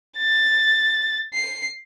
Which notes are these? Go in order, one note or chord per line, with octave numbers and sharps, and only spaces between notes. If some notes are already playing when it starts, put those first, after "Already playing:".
A6
C7